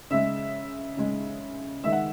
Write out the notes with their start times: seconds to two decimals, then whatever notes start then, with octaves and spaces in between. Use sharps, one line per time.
0.10 C#3 G#3 E5
0.97 C#3 G#3
1.84 D#3 G#3 E5
1.92 F#5